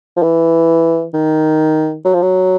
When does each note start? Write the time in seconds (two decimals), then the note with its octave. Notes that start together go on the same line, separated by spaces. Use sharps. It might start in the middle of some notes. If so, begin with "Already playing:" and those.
0.16 F3
0.23 E3
1.14 D#3
2.05 F#3
2.14 F3
2.22 F#3